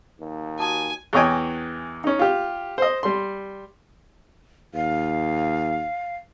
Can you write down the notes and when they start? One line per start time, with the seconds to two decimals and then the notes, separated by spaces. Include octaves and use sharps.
0.20 D#2
0.60 F#4 G#5 A5 D#6
1.13 E2 E3 C#5 D#5 G5 G#5
2.04 C#4 D#4
2.19 F4 G4
2.78 C5 D#5
3.03 G3 C6
4.75 D#2 F5